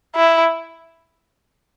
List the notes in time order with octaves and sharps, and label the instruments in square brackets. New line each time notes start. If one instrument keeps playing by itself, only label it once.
[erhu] E4